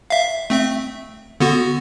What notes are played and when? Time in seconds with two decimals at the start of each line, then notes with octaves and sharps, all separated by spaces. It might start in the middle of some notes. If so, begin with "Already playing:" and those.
0.10 E5 F5
0.50 A3 C4 E5
1.40 D3 B3 F#4